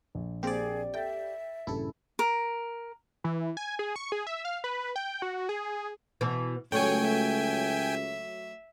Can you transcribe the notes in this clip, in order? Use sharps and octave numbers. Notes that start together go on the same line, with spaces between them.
A#1
A#3 C4 G4 G#4 D5
A4 E5 G5 A6
A#1 G2 C#3 E4 A4
A#4
E3
G#5
G#4
C#6
G#4
E5
F5
B4
G5
F#4
G#4
B2 E3
C#2 F#3 A3 C#5 G5 G#5
E5